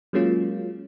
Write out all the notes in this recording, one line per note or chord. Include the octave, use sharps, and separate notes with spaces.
F#3 G#3 A#3 C#4 F4